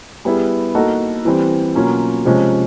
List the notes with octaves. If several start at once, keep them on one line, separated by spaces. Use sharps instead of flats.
G3 B3 E4 G#4
A#3 D#4 F#4 A4
E3 G3 C4
B2 F#3 A#3 C#4 F4
C3 F3 G#3 C#4